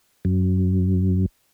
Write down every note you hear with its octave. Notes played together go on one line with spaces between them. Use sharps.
F#2